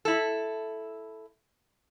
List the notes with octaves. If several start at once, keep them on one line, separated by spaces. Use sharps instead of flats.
E4 A4